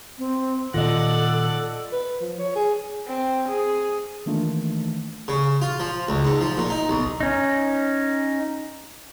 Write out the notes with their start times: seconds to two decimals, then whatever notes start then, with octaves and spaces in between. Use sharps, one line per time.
0.19 C4
0.74 A#2 D#3 F4 A4 D5 D#5 F#5
1.92 B4
2.21 F3
2.39 C#5
2.56 G#4
3.07 C4
3.49 G#4
4.26 D#3 E3 A3 A#3 D4 F4
5.28 C#3
5.62 F4
5.80 F3
6.09 C#2
6.25 G#2
6.41 F3
6.57 A#2
6.70 D#4
6.89 B1
7.20 C#4 D#4